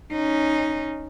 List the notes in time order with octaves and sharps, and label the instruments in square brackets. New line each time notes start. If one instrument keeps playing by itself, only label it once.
[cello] C#4 D#4